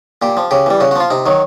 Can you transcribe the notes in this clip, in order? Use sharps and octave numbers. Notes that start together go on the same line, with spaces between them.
A#2 G4
F3
C#3 G4
E3 G3
C#3 F#4
F#4
F3 F4
C3 D#4
D#3 F#3